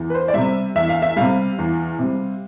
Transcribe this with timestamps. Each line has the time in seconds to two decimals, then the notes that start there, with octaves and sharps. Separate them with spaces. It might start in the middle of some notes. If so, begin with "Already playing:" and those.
Already playing: E2
0.10 B4
0.14 C5
0.28 D5
0.34 C3 G3 E5
0.75 E2 E5
0.89 F5
1.02 E5
1.16 C3 G3 F5
1.58 E2
1.99 C3 G3